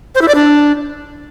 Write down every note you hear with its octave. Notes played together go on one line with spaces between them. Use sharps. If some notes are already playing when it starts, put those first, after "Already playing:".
C5
E4
D5
D4